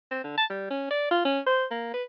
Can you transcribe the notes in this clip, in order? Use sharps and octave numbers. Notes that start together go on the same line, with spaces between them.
C4
D3
A5
G3
C#4
D5
F4
C#4
C5
A#3
B4